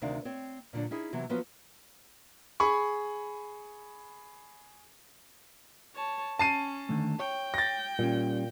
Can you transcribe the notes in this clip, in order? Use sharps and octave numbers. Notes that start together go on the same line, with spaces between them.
D2 C3 D#3 D4 F5
C4 C#5
A#2 D3 F#3 D4
C#4 D#4 E4 G#4
C3 E3 F#3 B3
F3 F#3 B3 C#4 F#4
G#4 B5 C#6
C#5 A5
C#4 A5 C7 D#7
D3 D#3 A3
C#5 G5
A6 A#6
A#2 G3 C#4